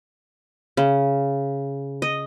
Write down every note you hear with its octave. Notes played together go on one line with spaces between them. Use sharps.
C#3
D#5